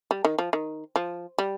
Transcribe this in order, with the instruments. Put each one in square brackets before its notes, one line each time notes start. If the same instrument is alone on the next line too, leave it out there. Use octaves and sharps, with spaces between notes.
[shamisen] G3
D#3
F3
D#3
F3
G3